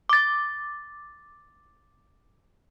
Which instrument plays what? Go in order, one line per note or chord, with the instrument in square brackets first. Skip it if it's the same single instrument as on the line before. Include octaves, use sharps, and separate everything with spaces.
[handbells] D6 A6